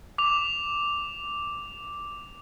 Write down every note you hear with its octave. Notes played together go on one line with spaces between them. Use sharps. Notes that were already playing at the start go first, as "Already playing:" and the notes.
D6 F7